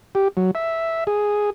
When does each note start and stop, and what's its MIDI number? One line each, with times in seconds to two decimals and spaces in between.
0.15 0.28 67
0.37 0.51 54
0.55 1.04 76
1.07 1.50 68